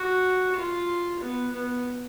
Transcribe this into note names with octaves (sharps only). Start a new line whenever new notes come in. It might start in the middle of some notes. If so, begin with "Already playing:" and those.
Already playing: F#4
F4
B3
B3